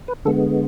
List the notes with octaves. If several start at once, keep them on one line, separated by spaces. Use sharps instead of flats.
B4
D3 G#3 B3 A4